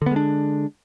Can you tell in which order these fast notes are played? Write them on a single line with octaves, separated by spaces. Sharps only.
D3 B3 G#3 D4